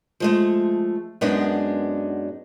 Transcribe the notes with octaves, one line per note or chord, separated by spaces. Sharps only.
F3 G#3 A3
F#2 G#3 B3 D4 D#4